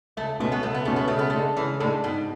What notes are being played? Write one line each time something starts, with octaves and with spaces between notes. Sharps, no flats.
C#2 A3
B2 G#3 A3 C#4 G#4
B3
C#2 A3
B3
B2 G#3 A3 C#4 G#4
B3
C#3 A3
B3
A3
G#3 D4 A4
C#3 E3
A2 G#3 D4 A4
G#2 B2